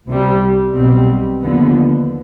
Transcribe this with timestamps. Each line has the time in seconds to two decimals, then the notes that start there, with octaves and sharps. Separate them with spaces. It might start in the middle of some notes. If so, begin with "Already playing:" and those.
0.08 C2 C3 G3
0.76 B1 B2 G3 C4
1.44 D#2 D3 F3 B3